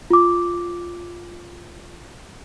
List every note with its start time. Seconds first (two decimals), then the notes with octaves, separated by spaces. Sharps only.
0.10 F4 D6